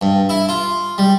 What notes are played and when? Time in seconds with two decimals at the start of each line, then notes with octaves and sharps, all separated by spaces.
0.01 G2
0.29 E4
0.49 F4
0.98 G3